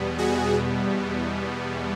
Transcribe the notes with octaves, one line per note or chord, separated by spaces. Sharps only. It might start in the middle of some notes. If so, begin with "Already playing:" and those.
Already playing: E2 B2 G3 B3
F#4 G#4